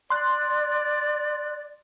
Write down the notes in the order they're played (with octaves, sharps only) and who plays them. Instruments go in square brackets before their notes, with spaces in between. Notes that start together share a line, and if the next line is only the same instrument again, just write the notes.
[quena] D5 [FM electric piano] C6 F#6